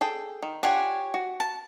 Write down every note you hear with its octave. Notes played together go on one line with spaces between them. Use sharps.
G#4 A4 G5
D#3
D4 F4 G4 C#5 F#5 G#5
F#4
A5